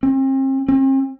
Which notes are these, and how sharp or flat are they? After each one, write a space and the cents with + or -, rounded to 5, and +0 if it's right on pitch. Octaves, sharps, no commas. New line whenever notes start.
C4 +40
C4 +45